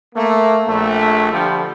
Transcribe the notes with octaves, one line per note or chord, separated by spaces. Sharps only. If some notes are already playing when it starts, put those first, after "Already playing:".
A3 A#3
A#1 A3
D3 F3 G3